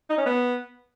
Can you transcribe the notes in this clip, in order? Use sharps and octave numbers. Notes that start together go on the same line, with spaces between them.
D#4
C#4
B3